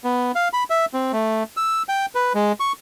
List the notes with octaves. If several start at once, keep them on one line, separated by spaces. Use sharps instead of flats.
B3
F5
B5
E5
C4
A3
E6
G5
B4
G#3
C#6